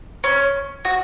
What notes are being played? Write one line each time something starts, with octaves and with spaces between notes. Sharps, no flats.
C#4
F#4